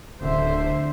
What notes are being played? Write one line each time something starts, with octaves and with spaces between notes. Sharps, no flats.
D1 D3 C5 E5